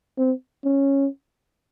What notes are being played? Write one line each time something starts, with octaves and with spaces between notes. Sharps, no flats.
C4
C#4